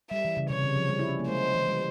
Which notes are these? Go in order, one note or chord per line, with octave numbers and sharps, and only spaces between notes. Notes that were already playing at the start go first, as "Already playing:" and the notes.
G3 E5
E3
C#3
C3 C#5
C#3
F3
G3
E4
C#4
A#3
G#3 C5
E3
G3